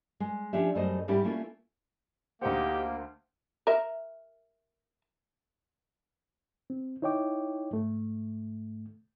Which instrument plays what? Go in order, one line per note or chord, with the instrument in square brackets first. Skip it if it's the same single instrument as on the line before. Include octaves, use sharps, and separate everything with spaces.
[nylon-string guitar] G#3
F3 C#4 D4 G4 E5
F#2 G3 A3 C5 D#5
G#2 G3 C#4 E4 G4
A3 A#3 C#4 E4 F4
[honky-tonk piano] D2 C5 [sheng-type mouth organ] A#3 [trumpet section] D#4 G4 [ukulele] F#5
[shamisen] A#4 E5
[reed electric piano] C4
D#4 E4 C#5 D#5 G5 D6
G#2 A3